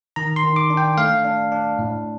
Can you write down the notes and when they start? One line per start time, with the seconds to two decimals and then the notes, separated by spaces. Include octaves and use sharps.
0.16 D#3 A#5
0.36 C6
0.44 D#3
0.56 D6
0.70 D4
0.77 G5
0.98 A3 F5
1.25 D4
1.52 D4
1.79 A2